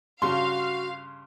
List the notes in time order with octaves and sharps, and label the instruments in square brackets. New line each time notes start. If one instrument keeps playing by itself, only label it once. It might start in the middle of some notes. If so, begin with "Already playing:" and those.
[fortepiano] G2 C#3 [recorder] F#4 [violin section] F5 [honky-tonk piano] C6